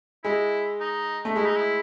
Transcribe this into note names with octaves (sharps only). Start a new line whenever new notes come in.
G#3 E4
D#4
A3
G#3 E4
D#4
E4